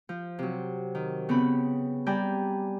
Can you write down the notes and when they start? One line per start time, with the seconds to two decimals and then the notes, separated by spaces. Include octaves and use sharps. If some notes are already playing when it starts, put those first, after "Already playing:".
0.09 F3
0.39 C3 F#3
0.95 D#3
1.29 C#3 B3 C4 B5
2.06 G3 D5 G5 G#5 A#5 B5